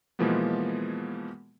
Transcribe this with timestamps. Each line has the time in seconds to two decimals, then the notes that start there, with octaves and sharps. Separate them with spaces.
0.19 B2 E3 F3 G#3 A#3 B3